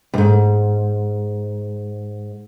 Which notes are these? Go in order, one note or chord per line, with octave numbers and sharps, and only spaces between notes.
D#2 G#2